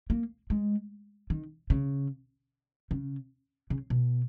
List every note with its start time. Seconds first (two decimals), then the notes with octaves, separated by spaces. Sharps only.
0.10 A#3
0.50 G#3
1.30 D#3
1.70 C#3
2.91 C#3
3.70 C#3
3.90 B2